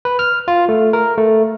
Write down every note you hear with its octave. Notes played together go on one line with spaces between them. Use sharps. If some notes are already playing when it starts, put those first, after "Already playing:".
B4
F6
F4
A3
A#4
A3